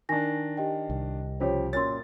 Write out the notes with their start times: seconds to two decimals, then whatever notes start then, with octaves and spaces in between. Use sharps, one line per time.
0.09 D#3 D4 G#5 A#6
0.57 G4 D#5 G5
0.90 C2
1.40 C#3 F3 G4 C5 C#5
1.73 F#2 A#2 C#5 C6 A6